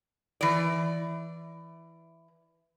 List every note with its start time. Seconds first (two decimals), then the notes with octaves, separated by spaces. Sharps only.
0.41 E3 D5